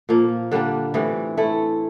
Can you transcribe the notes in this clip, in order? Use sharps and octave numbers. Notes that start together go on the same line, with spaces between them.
A#2 F3 A#3
D3 G3 A#3 D4
A2 E3 G3 C4
A3 E4 A4